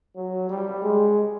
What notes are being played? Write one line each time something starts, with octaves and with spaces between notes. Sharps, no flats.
F#3
G3
G#3